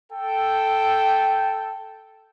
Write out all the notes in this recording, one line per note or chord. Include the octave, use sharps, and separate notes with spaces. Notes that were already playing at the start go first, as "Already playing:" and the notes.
A4 G5